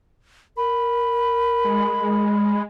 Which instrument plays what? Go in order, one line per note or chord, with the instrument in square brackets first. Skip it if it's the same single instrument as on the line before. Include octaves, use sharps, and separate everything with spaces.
[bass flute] A#4 [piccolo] B5
[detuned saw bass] G#3